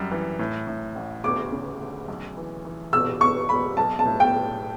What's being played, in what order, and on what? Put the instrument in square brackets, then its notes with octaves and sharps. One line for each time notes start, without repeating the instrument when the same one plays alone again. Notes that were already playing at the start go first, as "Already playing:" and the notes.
Already playing: [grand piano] F#2 G3
E3
A2
A2
A1
[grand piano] D2 [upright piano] D6
[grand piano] C#3
D2
B1
E3
E3
[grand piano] B2 [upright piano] E6
[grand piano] B2 [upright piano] C#6
[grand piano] F#1 [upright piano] B5
[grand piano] B1 [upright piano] A5
[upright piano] A5
[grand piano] A2
[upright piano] G5